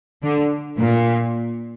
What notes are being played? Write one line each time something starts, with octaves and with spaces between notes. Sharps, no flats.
D3
A#2